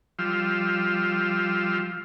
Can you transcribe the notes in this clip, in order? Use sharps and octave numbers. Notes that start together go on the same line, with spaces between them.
F3 G3 F4 E6